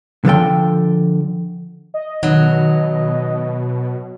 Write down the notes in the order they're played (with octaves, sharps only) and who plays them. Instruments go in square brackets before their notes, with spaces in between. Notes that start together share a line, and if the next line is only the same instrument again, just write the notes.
[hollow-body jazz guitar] D3 F3 A4 G5
[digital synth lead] D#5
[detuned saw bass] B2 [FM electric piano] D#3 [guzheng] F#3